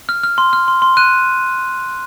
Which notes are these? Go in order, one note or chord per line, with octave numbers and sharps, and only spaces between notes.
F6
F6
C6
F6
C6
C6
F#6 D#7